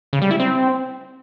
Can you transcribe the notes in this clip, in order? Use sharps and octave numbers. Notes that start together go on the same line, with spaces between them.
C#3
G3
E4
C4